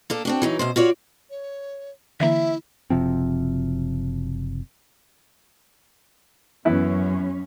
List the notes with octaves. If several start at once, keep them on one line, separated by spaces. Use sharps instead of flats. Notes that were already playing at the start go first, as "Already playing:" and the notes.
A#3 D4 A4
C4 D4 F#4
E3 F#3 D#4
F#2 B2 C5
F4 F#4 C#5 D5
C#5
D3 E3 A#3 E4 E5
F#1 C3 F3 C4
F#2 E3 B3 C#4 E4